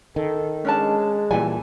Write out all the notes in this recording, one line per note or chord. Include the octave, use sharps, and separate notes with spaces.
D#3 A4
G#3 C#4 D4 A5
A#2 E3 G3 G#5